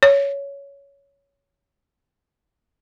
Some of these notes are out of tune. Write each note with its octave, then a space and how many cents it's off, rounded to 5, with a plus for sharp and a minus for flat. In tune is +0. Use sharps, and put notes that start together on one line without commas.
C#5 +10